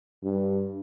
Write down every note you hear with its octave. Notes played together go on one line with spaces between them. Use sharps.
G2